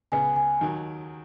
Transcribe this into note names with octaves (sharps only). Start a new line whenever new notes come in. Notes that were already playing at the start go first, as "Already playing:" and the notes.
C#2 C#3 B3 G#5
G#5
D#2 D#3 F#3